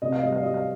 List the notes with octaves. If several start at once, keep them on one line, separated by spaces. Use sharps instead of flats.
C3 D#5
F5
G3 D#5
F5
G3 D#5
F5